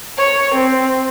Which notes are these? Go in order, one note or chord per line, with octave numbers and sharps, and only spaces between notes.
C#5
C4